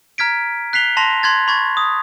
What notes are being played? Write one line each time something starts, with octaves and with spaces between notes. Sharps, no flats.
A#5 F6 G#6 B6 D7
F#6 B6 C7 F7 G7
A5 C6 A#6 F7
C6 F#6 G#6 A6
B5 C#6 G#6 A6
D#6